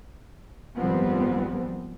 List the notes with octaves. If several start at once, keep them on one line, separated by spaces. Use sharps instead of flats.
G#1 F#2 F3 G3 B3 C4